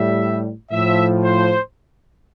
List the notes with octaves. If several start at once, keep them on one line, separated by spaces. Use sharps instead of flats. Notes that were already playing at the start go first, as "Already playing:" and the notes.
Already playing: A2 G3 E5
A2 F3 E5
C5